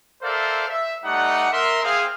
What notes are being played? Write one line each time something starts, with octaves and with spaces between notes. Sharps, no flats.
A4 A#4 C5 D5 E5 F5
E5
G3 A3 D#4 F#5
A#4 E5 C6
C4 G#4 F5